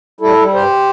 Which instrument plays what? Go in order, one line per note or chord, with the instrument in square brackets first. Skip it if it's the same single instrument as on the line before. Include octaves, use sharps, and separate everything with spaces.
[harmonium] G3 E4 A4
G3
G2 G4 C5